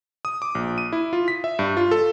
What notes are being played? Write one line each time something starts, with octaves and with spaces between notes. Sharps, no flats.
D#6
D6
A#1
D#7
E4
F4
B6
E5
G2
F4
A4